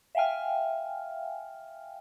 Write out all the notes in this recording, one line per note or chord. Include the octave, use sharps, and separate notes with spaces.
E5 F5 G5 G#5 F6